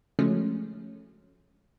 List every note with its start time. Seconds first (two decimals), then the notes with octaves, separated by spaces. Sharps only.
0.19 C#3 F3 F#3 G#3 A3 C#4